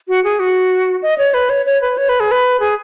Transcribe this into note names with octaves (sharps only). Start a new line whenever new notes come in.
F#4
G#4
F#4
D#5
C#5
B4
C#5
C#5
B4
C#5
B4
G#4
B4
G#4